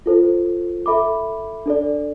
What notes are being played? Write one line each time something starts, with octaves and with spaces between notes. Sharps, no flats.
F4 A4 C5
A4 E5 B5 D6
D4 A4 D5